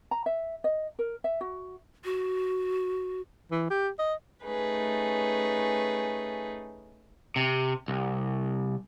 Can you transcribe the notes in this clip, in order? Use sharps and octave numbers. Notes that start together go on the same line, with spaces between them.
A#5
E5
D#5
A#4
E5
F#4
F#4
E3
G4
D#5
A3 C#4 D#4 G#4 B4
C3
C2